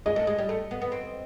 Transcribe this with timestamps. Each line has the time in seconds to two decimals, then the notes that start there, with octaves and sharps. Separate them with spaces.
0.06 G#3 D#5
0.16 A3
0.27 G#3
0.38 G3
0.49 A3
0.71 B3
0.82 B3
0.92 C4